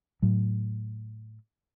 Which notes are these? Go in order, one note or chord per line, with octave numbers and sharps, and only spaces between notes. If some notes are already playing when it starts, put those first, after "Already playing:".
A2 F#3